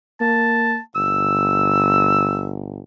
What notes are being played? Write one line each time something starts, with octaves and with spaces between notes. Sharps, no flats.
A#3 A5
G1 E6